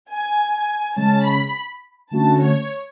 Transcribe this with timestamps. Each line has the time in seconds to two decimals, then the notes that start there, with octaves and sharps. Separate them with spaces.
0.09 G#5
0.96 C#3 G#3 C#4 A5
1.25 B5
2.11 D3 A3 C#4 F#4 A5
2.40 C#5